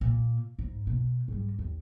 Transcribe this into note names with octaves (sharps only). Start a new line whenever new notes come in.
A#2
G#2
B2
G#2 G3
D#2